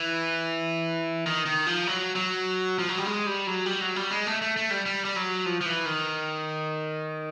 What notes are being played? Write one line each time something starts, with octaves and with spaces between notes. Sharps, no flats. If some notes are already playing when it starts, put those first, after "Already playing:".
Already playing: E3
D#3
D#3
F3
F#3
F#3
F3
F#3
G3
G#3
G3
F#3
G3
F#3
G3
G#3
A3
A3
A3
G3
G3
G3
F#3
F3
F3
E3
D#3